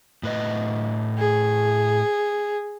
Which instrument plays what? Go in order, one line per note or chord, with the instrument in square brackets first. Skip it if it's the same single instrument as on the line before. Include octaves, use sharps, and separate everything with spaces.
[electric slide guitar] A2 B4 D#5
[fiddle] G#4